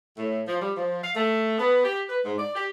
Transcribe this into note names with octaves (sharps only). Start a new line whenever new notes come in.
A2
F3
G3
F3
F5
A3
B3
G4
B4
G#2
D5
G4